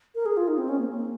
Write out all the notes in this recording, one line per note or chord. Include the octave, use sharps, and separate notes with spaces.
A#4
G#4
F4
D#4
C4
C#4
A#3
A#3